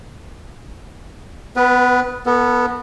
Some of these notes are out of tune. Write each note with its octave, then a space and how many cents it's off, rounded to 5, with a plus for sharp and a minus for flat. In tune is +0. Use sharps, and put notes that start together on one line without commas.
B3 +20 B4 -15
B3 -10 A4 +30